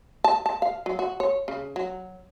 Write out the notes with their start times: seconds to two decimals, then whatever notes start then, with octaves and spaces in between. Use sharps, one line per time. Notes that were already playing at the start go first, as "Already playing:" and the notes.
0.24 A5
0.46 A5
0.62 F5
0.86 F#3
0.99 F#4
1.20 C#5
1.48 C#3
1.76 F#3